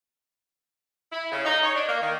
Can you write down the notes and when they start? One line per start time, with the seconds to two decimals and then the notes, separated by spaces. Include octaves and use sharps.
1.12 E4
1.32 C#3
1.45 D#4
1.63 C#5
1.75 D4
1.87 A#3
2.01 D#3